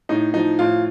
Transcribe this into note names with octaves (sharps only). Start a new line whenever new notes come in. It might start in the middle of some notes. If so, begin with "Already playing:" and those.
A2 D#4
F3 D#4
A2 F4